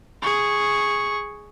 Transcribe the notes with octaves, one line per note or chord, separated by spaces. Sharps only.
G#4 C#6